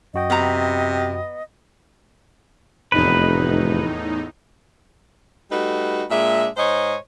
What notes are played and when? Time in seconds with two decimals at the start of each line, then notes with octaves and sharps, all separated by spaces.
0.14 F#2 F#4 D#5 G5
0.30 C3 B3 A#5
2.92 F1 E2 A2 D#4 B4
5.51 G3 A3 D#4 F#4 B4
6.10 A#2 G#3 D4 E5
6.57 G#2 C5 C#5 D#5